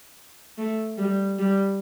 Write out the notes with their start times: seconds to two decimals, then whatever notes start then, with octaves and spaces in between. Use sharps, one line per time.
0.58 A3
0.98 G3
1.39 G3